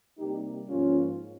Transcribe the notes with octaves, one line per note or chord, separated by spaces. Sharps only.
C3 G3 A#3 D#4 G4
G#2 F3 A#3 C#4 F4